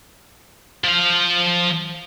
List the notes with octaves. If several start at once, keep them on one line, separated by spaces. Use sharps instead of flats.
F3 F5